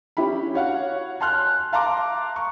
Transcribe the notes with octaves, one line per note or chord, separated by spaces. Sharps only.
C#4 D4 E4 G4 B5
F#4 C#5 F5 F#5
G#5 A5 C6 F6 F#6
E5 F5 A5 A#5 C6 D6
C#6